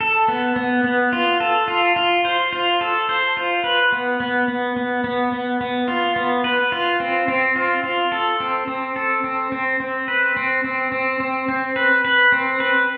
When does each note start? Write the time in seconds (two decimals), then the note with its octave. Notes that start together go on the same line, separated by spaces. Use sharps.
0.01 A4
0.28 B3
0.56 B3
0.84 B3
1.13 F4
1.40 A4
1.68 F4
1.96 F4
2.25 C5
2.53 F4
2.81 A4
3.09 C5
3.37 F4
3.64 B4
3.92 B3
4.20 B3
4.48 B3
4.77 B3
5.04 B3
5.32 B3
5.61 B3
5.88 F4
6.16 B3
6.44 B4
6.72 F4
7.00 C4
7.28 C4
7.56 F4
7.84 F4
8.12 A4
8.40 C4
8.68 C4
8.96 A4
9.24 C4
9.52 C4
9.80 C4
10.08 B4
10.37 C4
10.64 C4
10.92 C4
11.20 C4
11.48 C4
11.76 B4
12.05 B4
12.32 C4
12.60 B4